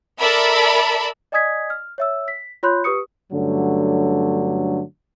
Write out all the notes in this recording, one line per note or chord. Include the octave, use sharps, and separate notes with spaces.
A4 A#4 D5 E5 A5 B5
D5 D#5 G#5 D#6 G#6 B6
F6
C#5 E5 E6
B6
F4 C#5 B5 C6 F#6 G6
G4 B4 C#6 D#6 C#7
G2 D3 F#3 A3 C#4